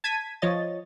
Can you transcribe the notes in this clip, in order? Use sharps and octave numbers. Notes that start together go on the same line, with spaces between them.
A5 G#6 B6 D#7
F3 C#5 D#5 A6